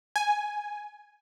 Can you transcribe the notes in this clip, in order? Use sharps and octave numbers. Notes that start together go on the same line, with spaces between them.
G#5